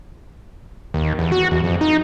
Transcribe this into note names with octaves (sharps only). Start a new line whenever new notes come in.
D#2
E2
F#4
E2
F2
D#4